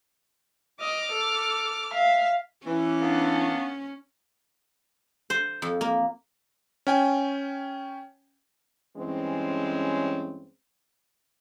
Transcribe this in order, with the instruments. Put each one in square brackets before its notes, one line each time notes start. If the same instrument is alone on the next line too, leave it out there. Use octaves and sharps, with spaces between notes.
[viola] D#5 [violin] D6 F6
[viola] A4
[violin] E5 [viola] F5
[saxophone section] E3 [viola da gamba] C#4
[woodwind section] A#3 B3 D4
[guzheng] C5
F2
A#3
[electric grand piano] C#4 G5 G#5
[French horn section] G2 E3 G#3 C4 C#4